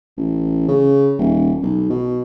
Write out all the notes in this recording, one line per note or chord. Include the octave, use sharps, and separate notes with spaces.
A1
C#3
D#1
B1
B2